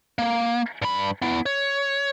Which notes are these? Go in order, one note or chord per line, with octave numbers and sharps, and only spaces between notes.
A#3
G2 B5
B3 E4
C#5